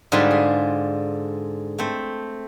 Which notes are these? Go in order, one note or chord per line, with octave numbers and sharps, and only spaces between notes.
G#2 D3 G3 F4 B4 C6
G#4
A3 C4